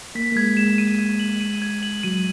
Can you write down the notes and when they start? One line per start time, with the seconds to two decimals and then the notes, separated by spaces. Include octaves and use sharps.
0.15 A#3 B6
0.32 A#3
0.36 G#3 G#6
0.57 G#3 E7
0.78 D#7
0.99 G#6
1.19 F#7
1.41 D#7
1.62 G#6
1.83 F#7
2.03 F#3 D#7